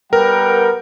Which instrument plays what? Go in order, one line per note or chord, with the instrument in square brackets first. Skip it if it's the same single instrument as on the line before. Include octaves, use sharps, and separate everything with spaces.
[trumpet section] G3 F#5 G5 [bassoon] B3 [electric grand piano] A#4